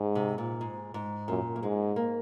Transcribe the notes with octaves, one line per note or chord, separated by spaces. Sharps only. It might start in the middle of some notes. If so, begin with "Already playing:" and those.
Already playing: G#2
C3
A#2
G#2
G#2
F#2 A#2
A#3
G#2 G#3
A#3